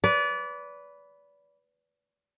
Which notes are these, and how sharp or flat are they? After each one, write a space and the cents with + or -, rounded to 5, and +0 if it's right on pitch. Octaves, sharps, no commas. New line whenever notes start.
B4 +0 D5 -30